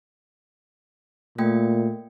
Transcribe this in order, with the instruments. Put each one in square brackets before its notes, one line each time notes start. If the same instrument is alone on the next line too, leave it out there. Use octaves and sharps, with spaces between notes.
[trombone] A#2 [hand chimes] A3 A#3 G5